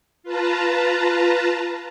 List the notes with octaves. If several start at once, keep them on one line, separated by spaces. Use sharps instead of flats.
F4 B4 A5 A#5